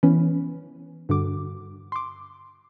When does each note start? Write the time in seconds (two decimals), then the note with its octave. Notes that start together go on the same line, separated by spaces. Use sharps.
0.03 E3 B3 C#4 B4
1.09 G2 D3 F#4 D6
1.92 C6 D6